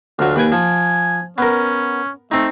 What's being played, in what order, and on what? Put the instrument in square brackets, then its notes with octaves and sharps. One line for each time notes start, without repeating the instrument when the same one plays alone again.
[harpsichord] D2 F#3 [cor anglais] F4
[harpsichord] D#2 G5 G#5 [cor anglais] B4
[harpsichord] F3 [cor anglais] G#5
[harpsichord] B3 A#4 [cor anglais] C#4
[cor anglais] A3 [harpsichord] C4 D#4